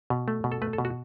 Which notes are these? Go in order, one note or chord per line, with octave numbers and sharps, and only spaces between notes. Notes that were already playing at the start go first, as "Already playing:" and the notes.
B2
A3
B2
A4
A3 B4
A4
B2
F#4